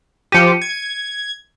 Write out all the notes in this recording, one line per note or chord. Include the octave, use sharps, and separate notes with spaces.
F3 G4 C#7 D#7
G#6